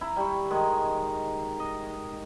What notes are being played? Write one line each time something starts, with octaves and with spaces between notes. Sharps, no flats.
E4 A#5
G3 C#6
D#3 G#3
D#5